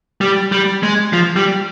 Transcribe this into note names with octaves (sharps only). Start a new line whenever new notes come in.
G3
G3
G#3
F3
G3